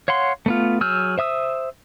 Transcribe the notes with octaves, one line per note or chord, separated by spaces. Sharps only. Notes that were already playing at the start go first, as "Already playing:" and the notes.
C#5 F5 F#5 C6
A3 B3 F4
F#3 G#4 E6 F6 G6
C5 E5 D#6 E6